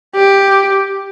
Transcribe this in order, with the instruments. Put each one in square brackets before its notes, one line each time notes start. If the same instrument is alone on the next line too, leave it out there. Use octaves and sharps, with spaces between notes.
[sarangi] G4